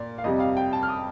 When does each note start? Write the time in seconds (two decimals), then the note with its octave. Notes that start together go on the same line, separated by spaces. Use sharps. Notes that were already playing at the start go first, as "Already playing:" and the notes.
Already playing: A#2 D5
0.18 F5
0.24 F2 C3 G3 D#5
0.40 F5
0.57 G5
0.73 A5
0.83 F6
0.89 D#6